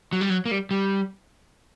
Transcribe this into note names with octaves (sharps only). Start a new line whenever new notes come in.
F#3
G3
F#3
A#3
G3
G3